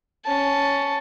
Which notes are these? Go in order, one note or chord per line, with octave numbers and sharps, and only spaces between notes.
C#4 A5